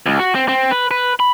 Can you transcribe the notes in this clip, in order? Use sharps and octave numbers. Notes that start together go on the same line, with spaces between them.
C#2
F#4
C4
C4
B4
B4
B5